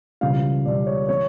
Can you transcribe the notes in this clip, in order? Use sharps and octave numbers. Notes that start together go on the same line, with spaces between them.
C#2 C#3 E3 G3 F5
C#2 C#3 E3 G3 D5
C#5
E3 C#5